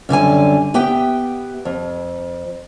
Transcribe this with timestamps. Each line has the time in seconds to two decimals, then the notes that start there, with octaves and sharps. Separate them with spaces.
0.09 F#2 D3 G3 G#5
0.74 B3 G4 E5 G5
1.65 F2